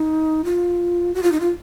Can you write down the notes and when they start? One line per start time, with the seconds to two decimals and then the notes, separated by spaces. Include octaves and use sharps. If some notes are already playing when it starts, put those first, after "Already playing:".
Already playing: D#4
0.45 F4
1.14 F#4
1.23 F4
1.32 D#4
1.40 F4